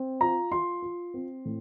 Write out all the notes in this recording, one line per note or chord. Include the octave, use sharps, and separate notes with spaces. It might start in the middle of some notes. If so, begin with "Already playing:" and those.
Already playing: C4
F4 A#5
F4 C6
F4
C4
A2